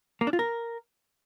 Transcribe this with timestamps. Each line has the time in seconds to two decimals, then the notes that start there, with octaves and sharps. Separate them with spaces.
0.21 A#3
0.27 D4
0.33 F4
0.39 A#4